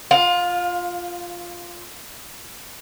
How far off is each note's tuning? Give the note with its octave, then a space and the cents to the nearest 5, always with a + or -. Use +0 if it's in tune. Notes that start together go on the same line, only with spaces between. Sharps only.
F4 +0 F5 +25